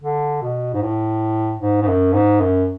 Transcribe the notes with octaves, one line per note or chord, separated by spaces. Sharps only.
D3
B2
G#2
A2
G#2
G#2
F#2
G#2
F#2